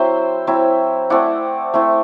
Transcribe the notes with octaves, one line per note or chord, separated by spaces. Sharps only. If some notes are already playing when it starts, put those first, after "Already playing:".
Already playing: F#3 C4 E4 C5 E5
F#3 C4 E4
A3 C4 E4 D5 F#5
A3 C4 E4